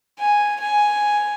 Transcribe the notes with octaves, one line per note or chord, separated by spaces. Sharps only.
G#5
G#5